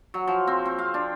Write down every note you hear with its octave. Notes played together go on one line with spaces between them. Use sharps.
F#3
F3
C4
C4
F5
D4